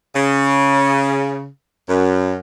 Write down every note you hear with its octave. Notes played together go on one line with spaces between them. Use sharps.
C#3
F#2